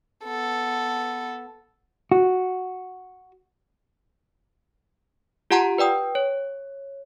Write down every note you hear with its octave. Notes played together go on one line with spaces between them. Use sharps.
B3 A4
F#4
F4 G4 F#5 A5 A#5 C6
B4 D5 G5 D#6
C#5